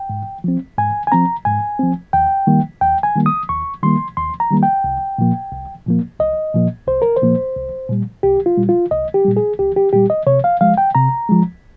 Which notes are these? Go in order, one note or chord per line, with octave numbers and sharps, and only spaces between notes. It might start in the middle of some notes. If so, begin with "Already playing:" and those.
Already playing: G5
G#2
F3 C4
G#2 G#5
G#5
F3 C4 A#5
G#2 G#5
F3 C4
D#2 G5
D#3 G3 A#3
D#2 G5
G#5
D#3 G3 A#3
D#6
D#2 C#6
D#3 G3 A#3 C6
D#2 C6
A#5
D#3 G3 A#3
G5
C2
A#2 F3 A#3
C2
A#2 F3 A#3
C2 D#5
A#2 F3 A#3
C2 C5
A#4
C5
A#2 F3 A#3
C2
A#2 G3
C2 G4
F4
A#2 G3
F4
C2 D#5
G4
A#2 G3
G#4
C2 G4
G4
A#2 G3 G4
D#5
C3 C#5
F5
F3 G#3 F5
G5
C3 A#5
F3 G#3